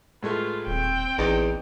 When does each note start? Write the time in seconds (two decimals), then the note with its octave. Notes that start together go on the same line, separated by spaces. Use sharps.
0.23 A2 G#3 A3 F4 B4
0.67 D#1 C4 G5
1.18 A1 E2 D#4